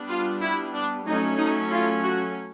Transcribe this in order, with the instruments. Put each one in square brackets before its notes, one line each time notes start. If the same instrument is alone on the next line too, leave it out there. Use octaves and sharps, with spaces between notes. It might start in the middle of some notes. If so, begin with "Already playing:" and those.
Already playing: [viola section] G3 B3 D4
F4
E4
D4
F#3 A3 C#4 D#4
D#4
F4
F#4